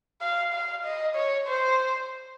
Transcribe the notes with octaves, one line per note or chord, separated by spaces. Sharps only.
F5
F5
D#5
C#5
C5